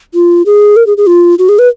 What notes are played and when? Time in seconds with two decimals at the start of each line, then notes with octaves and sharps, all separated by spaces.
0.14 F4
0.46 G#4
0.76 A#4
0.86 G#4
0.97 G#4
1.07 F4
1.39 F#4
1.49 G#4
1.59 B4